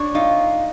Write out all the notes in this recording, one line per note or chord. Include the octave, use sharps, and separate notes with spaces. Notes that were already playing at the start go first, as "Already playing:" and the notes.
Already playing: D4 C#5
D#4 F4